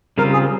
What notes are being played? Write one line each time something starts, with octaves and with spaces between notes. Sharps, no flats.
C#3 G3 C4 F4 A#4
G#4